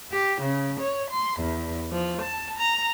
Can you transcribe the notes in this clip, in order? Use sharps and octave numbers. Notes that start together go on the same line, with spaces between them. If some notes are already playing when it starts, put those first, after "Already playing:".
G4
C#3
C#5
C6
E2
F3
A5
A#5